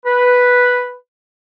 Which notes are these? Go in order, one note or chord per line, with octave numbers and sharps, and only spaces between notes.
B4